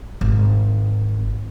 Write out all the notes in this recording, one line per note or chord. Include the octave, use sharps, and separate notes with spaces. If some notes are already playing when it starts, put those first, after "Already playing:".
G#1